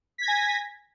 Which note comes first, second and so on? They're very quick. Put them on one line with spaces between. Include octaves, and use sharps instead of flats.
B6 G#6 A#6 G#5